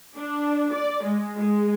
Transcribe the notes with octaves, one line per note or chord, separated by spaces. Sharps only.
D4
D5
G#3
G#3